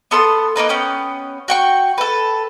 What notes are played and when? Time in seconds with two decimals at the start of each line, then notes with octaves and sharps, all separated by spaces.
0.11 B3 A4 C6 D#6
0.56 A#3 B3 D#4 B4
0.69 B3 C#4 G5 D#6
1.48 F#4 G5 C#6
1.98 A4 B4